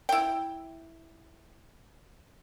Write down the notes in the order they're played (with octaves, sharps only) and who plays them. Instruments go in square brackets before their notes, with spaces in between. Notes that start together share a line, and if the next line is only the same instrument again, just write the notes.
[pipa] E4 G5